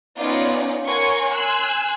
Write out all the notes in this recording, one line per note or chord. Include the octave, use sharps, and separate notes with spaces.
B3 C#4 D#4 F4 D5
A#4 C#5 F#5 G#5 C6 C#6
G#5 C6 E6 F#6